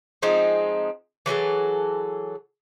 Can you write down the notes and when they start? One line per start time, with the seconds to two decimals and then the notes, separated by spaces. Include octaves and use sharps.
0.22 F3 G#3 C4 D#4
1.26 E3 F#3 G#4 A4